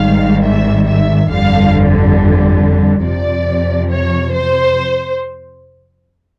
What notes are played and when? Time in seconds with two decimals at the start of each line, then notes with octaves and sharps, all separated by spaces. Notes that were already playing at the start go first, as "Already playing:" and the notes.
Already playing: G#1 G#2 D#3 G3 F5
0.44 E5
0.88 E5
1.31 G1 F2 D3 G3 F5
3.04 F2 C3 F3 D5
3.91 C#5
4.34 C5